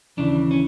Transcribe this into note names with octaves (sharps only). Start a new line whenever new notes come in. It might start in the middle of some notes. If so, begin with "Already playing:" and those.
D#2 C#3 E3 D4
C#4